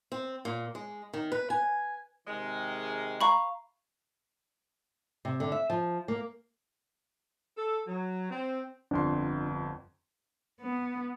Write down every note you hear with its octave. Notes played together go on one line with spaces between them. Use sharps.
C4
A#2
G#3
D#3
B4
G#5
C3 D#3 G#3
F5 A#5 B5 C#6
C3
D3
E5
F3
A#3
A4
F#3
C4
G1 F2 D4 C6
B3